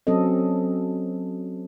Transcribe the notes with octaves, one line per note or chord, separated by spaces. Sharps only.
F#3 C4 C#4 A4 D#5